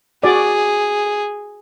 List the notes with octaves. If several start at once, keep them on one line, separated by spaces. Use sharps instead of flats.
F#4 G#4 D5